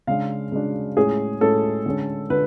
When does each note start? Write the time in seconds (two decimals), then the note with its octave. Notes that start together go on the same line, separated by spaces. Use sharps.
0.07 C#3 G#3 D4 F5
0.52 C#3 G#3 D4
0.97 A2 G#3 C#4 G#4
1.41 A2 G#3 C#4 A4
1.86 D3 G#3 C#4
2.30 D3 B4